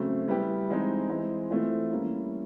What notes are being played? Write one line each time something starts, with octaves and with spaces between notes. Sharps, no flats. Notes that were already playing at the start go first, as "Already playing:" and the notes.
Already playing: C#3 F#3 A3 C4
G3 B3 E4 G4
E3 G#3 C4 D#4
E3 G#3 C4
E3 A3 C4 F4
E3 G3 A#3 C#4 E4